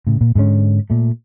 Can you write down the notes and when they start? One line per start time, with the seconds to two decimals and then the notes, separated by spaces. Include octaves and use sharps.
0.07 A2 C#3
0.21 A#2
0.35 G#2 D3 G#3 C#4
0.90 A#2 A3